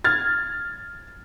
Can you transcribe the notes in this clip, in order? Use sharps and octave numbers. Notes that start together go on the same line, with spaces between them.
F6 G#6 A6